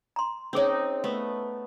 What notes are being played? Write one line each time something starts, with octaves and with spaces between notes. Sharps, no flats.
A#5 C6
C4 C#4 D#4 G#4 C#5
A3 B3